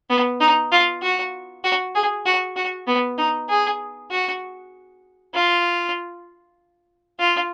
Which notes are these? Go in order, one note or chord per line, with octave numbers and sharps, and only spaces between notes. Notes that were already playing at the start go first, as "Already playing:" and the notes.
B3
D#4
F4
F#4
F#4
G#4
F#4
F#4
B3
D#4
G#4
F#4
F4
F4